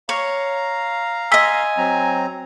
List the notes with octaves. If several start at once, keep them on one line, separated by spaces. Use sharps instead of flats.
C#5 F5 A#5
D#5 G#5 C6 E6 B6
F#3 C4 A#5